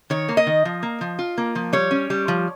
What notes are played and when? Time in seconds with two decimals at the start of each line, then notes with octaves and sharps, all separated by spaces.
0.10 D#3 C#5
0.28 A#3
0.37 D#5
0.47 D#3
0.65 F3
0.83 A#3
1.01 F3
1.19 F4
1.38 A#3
1.55 F3
1.73 G3 C#5
1.91 C#4
2.10 G3
2.28 F3